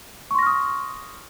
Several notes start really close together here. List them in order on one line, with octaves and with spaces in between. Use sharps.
C#6 C6 A#6 F6 D#6